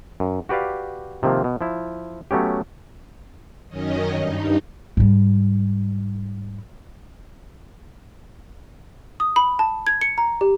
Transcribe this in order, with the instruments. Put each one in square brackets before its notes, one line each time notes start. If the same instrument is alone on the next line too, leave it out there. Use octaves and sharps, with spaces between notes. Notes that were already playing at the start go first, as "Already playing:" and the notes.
[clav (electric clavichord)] F#2
F#4 G4 B4 D5 F5
C3 D#3 F3 A#3
B2
F3 E4
F#3 A3 B3 C#4 G4
[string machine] F#2 D#3 C#4 D#5
G2 D#4
[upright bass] G#2 G3
[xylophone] D#6
B5
A5
G#6
C#7
A#5
G4